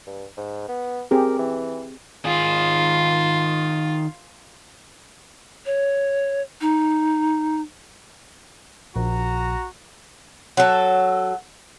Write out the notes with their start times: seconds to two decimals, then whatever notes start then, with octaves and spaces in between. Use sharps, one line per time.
0.07 G2
0.37 G#2
0.68 B3
1.11 C4 G4 G#4 A#4
1.39 E3
2.25 D#3 F4 G#4
5.65 C#5
6.61 D#4
8.96 A#1 F#4 A#5
10.57 F#3 A4